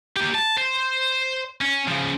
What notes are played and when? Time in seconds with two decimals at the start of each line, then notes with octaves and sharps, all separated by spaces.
0.17 A#3 G4
0.35 A5
0.58 C5
1.62 C#4
1.88 C#3 F3